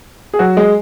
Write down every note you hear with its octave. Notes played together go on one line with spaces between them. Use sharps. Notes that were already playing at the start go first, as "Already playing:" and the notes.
G#4
F#3 F#4
G#3 G#4